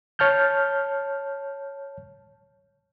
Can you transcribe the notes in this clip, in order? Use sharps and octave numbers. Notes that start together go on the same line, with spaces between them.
C#5 A5 F6 G6